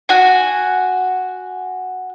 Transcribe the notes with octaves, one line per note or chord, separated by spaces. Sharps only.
F#4 G#5